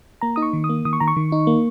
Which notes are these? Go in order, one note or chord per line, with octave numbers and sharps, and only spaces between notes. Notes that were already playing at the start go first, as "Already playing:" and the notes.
A#3 A#5
D#4 D#6
C#6
D#3
D#6
A#3
D#3 D#6
C#6
D#3 A#5
C#6
D#3
D#4
A#3